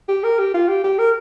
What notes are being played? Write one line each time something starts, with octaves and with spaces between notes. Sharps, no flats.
G4
A#4
G4
F4
G4
G4
A#4